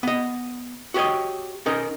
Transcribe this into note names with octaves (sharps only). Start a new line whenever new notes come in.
B3 D#5
F#4 G4 B4 C#5 D#5
C#4 D#4 A#4 D#5